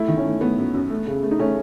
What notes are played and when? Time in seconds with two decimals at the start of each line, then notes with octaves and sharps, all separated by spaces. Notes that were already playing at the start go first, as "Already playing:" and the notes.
Already playing: A3 E4
0.08 D#3
0.17 C#4
0.24 A3
0.41 A3 B3
0.58 F#2
0.74 F#2
0.90 A3
1.07 C#3
1.23 A3
1.31 D#4
1.39 A3 C#4